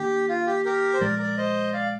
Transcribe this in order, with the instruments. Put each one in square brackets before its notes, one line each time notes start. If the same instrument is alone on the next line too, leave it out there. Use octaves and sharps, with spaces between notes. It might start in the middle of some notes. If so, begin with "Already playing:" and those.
Already playing: [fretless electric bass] D#3 A#3 D4 [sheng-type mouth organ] G4
[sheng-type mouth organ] F4
G4
G4 A#4
C5
[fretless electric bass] A#2 F3 G#3 [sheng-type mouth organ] A#4 D5
[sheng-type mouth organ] A#4 D5
C5 D#5
D5 F5